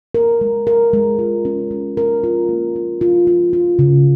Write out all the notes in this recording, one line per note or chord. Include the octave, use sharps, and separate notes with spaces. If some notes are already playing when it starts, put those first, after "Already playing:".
A#4
G#3
A#4
G#3
F4
C#4
G#3
A#4
F4
A#3
F4
F4
F4
F4
C#3